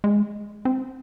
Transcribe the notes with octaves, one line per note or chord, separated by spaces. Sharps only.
G#3
C4